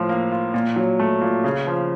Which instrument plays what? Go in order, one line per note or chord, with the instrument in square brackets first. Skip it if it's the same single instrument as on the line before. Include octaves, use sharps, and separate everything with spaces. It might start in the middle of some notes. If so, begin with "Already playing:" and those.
Already playing: [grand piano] A2 F3
A#3
F4
A#2
F#3
A3
A#2
C#3
F3